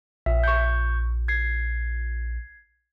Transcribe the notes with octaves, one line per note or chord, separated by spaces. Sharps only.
A#1 E5
C#6 G6
G#6 C7